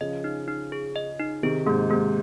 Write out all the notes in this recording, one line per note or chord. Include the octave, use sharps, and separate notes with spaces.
C#3 F3 D#5
D#4
D#4
G#4
D#5
D#4
C3 D#3 G#4
G#2 C3 A#3
G#2 C3 A#3